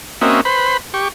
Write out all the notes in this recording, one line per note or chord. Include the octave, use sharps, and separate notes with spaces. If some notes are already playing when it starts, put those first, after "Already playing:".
A#3 C4 C#4 F#4 D#5 E5
B4 C5 B5
G4 C#6